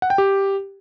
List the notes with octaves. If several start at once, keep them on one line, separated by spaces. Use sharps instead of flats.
F#5
G5
G4